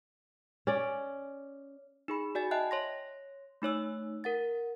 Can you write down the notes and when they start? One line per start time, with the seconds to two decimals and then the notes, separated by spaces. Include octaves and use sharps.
0.67 C#4 D5
2.08 D#4 G#4 B5
2.35 F#4 D5 G#5 A6
2.51 D#5 E5 G5 A5 F#6
2.71 C#5 C6 A#6
3.62 A3 D#4 C#5 E6
4.24 A#4 F#5 A6